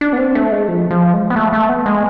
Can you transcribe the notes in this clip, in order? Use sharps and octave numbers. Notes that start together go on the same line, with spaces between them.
D4
B3
C4
A3
G#3
F3
F3
G#3
B3
A3
A3
B3
G#3